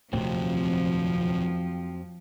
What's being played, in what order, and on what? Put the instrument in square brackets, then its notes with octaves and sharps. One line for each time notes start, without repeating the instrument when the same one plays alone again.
[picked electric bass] D#1 C3 [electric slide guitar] F2 F#3 C4 [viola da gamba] F3 [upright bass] A3